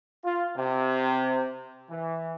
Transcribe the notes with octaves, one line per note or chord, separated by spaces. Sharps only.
F4
C3
E3